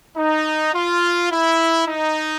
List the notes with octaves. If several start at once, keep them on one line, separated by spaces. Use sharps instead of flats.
D#4
F4
E4
D#4